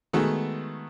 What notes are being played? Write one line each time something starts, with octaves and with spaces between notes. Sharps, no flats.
D#3 G#3 A3 B3 F#4